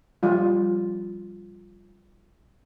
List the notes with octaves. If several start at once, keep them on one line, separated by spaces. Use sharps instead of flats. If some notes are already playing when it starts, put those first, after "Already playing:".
F3 G3 F4